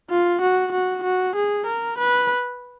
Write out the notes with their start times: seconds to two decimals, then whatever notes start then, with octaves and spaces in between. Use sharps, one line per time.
0.10 F4
0.41 F#4
0.72 F#4
1.03 F#4
1.36 G#4
1.66 A#4
1.98 B4